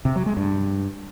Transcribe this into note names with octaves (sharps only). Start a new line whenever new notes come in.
C3
F#3
G#3
G2